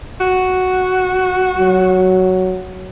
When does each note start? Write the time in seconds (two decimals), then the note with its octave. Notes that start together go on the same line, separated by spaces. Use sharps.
0.20 F#4
1.58 F#3